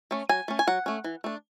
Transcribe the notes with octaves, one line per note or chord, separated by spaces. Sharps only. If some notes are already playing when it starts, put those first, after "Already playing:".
A3 C#4
F#3 G#5
A3 C#4
G#5
F#3 F#5
A3 C#4
E3
A3 D4